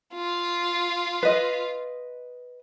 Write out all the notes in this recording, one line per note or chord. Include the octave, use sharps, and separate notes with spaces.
F4
B4 D#5